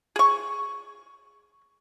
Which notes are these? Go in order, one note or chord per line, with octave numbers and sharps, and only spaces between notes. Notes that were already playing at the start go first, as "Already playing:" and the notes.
G#4 C#6